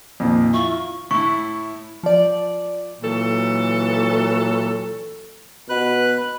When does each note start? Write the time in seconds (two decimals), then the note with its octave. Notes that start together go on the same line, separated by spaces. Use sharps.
0.20 F2 A#2 D#3
0.54 E4 F4 C#6
1.11 A2 E4 C#6
2.03 F3 D5
3.02 A#2 E3 F#3 A4
5.69 B2 B4 F#6